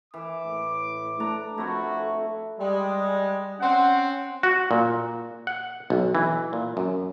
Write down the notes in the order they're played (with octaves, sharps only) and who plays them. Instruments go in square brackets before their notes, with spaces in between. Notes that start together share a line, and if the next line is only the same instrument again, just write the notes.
[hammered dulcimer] E3 [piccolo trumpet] D6
[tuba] A2
[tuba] A3 [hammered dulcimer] D4 A#5
[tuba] F2 [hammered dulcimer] A3 E4 [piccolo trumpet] F#4
[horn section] G3 G#3
C4 C#4 F#5
[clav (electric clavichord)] F#4
A#2
F#5
B1
E3
A#2
F#2